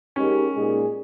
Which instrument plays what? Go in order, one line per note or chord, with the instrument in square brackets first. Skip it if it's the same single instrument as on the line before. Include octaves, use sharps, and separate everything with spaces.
[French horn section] G#3 D#4 G4 A#4 [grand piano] C#4
[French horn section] A#2 G#3 D#4 G#4